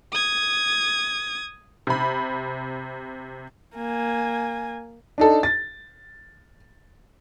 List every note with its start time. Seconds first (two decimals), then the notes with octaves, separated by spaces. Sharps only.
0.12 D#6 G#6
1.87 C3 B5
3.75 A#3 G#5
5.18 D4 D#4 A4
5.43 A6